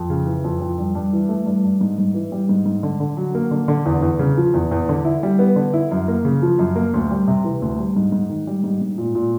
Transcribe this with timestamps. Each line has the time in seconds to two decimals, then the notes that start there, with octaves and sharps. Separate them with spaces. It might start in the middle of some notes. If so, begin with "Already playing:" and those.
Already playing: F2
0.10 C#3
0.26 E3
0.44 F2
0.61 F2
0.78 G2
0.95 G2
1.13 E3
1.29 A3
1.46 G2
1.64 G2
1.81 G#2
1.98 G#2
2.14 E3
2.32 G3
2.49 G#2
2.66 G#2
2.83 D3
3.00 D3
3.17 F#3
3.35 A#3
3.51 D3
3.68 D3
3.86 E2
4.02 E2
4.19 C#3
4.37 F3
4.54 E2
4.71 E2
4.89 D3
5.05 E4
5.23 G3
5.39 B3
5.56 D3
5.73 E4
5.91 F#2
6.08 A#3
6.25 C#3
6.42 F3
6.59 F#2
6.76 A#3
6.94 D2
7.11 G3
7.28 C3
7.45 E3
7.62 D2
7.79 G3
7.96 G#2
8.12 G#2
8.29 D#3
8.47 G3
8.64 G#2
8.82 G#2
8.98 A#2
9.15 A#2